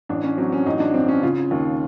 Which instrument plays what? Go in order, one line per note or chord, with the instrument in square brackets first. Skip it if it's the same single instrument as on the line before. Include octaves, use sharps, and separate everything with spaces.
[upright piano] A1 D4
C#4
F#3 C4
C#4
A1 D#4
D4
G2 C4
C#4
C#3 F4
D#2